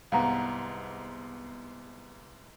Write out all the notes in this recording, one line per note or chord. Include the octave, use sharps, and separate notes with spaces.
C2 G#2 B3 F5 F#5 A#5